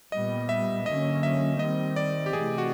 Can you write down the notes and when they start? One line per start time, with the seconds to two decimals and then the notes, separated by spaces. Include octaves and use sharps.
0.12 A#2 G3 B3 D#5
0.49 E5
0.86 D3 F#3 A#3 C#4 D#5
1.23 E5
1.59 D#3 G3 C4 D#5
1.96 D5
2.26 G4
2.33 C3 E3 A3 G#4
2.58 F#4